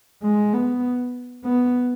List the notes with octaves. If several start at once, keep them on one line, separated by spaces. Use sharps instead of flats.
G#3
B3
B3